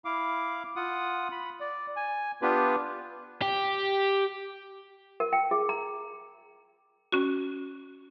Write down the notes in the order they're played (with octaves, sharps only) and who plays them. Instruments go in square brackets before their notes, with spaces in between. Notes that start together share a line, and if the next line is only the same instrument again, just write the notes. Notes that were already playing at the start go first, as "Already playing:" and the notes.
[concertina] E4 F5 D6
F4 F#5 D#6
B5
D5
G#5
B3 D4 F4 G4 B4
[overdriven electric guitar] G4
[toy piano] A#4
G5
G#4
A#5
[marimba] C#4 F#4